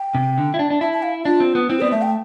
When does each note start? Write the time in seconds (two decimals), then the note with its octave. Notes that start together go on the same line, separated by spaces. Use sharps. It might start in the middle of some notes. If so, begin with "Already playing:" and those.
Already playing: G5
0.15 C3
0.38 D3
0.54 E4
0.59 D4
0.70 D4
0.81 E4 A5
0.93 A5
1.03 F5
1.25 D4 F4
1.40 C4
1.55 B3
1.69 C4 E4
1.80 B3 D5
1.92 A3 E5
2.02 G5